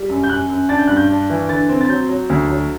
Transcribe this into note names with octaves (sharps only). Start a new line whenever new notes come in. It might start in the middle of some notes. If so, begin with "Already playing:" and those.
Already playing: G3
F#2
G6
F#2 F#6
F#2
D4 A6
G6
G2 F#6
G6
D4
E3
D3 A6
C4
A6
F#3 G6
F#3
D2
F#3